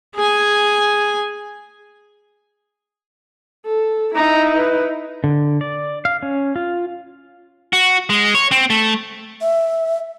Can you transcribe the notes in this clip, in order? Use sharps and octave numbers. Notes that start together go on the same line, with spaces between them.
G#4 G#5
A4
D#4 E4 A#5
B4
D3
D5
F5
C#4
F4
F#4
G#3
C#5
C4
A3
E5